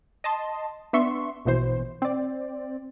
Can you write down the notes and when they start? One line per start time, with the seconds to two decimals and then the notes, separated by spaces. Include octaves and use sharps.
0.24 D#5 A5 C6
0.93 B3 D4 E5 C6 C#6
1.45 A#1 B2 E3 C5
2.02 C4 D5